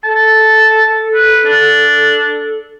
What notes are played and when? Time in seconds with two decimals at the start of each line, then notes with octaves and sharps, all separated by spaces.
0.04 A4 A5
1.14 B4
1.45 D4